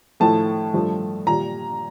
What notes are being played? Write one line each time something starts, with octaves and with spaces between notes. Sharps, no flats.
A2 F3 A3 A5
G2 F3 A3
A#2 G3 A#5